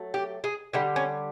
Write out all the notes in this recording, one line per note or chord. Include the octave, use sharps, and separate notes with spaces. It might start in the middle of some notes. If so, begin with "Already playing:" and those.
Already playing: F#3 A3
G4
G#4
D3 G3 G4
C#4